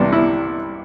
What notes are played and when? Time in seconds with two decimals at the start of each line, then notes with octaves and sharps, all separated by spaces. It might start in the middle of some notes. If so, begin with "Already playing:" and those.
Already playing: C2 C3 E3 D4
0.12 E4